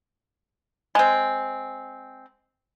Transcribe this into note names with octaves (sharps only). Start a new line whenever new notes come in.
G#3 C4